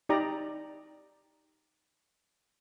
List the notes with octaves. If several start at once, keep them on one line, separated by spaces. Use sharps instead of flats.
D#4 G4 D5 A#5